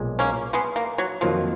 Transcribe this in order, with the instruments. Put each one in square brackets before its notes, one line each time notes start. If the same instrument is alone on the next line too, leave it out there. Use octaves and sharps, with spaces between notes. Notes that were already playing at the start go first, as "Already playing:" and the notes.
Already playing: [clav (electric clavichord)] B1 A#2 G#3
[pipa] A#3 C#4
G#3 B3
A#3
F#3
[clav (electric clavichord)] F2 D#3 F#3 A#3 F4 [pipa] F3